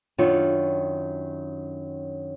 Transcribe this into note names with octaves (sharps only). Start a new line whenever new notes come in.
F#2 D#3 D4 F4 C#5